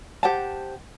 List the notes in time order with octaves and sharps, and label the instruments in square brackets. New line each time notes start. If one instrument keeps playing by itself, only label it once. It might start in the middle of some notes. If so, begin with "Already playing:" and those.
[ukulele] G4 C5 F#5 A5